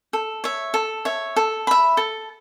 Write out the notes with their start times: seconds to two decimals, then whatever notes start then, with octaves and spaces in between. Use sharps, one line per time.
0.13 A4
0.44 C#5 E5
0.74 A4
1.05 C#5 E5
1.36 A4
1.67 E5 B5
1.97 A4